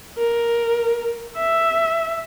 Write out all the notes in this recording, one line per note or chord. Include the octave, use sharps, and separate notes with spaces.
A#4
E5